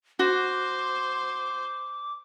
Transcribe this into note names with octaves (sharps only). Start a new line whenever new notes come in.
F#4 C5 D6